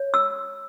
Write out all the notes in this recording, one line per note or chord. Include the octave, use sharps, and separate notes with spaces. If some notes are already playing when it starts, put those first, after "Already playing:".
Already playing: C#5
E6